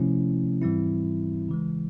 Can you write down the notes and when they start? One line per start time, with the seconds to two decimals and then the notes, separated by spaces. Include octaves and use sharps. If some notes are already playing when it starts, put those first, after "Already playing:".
Already playing: C3 F3 A3 C#4 E4
0.62 G#2 E3 G3 C4 E4
1.49 C#3 E3 G#3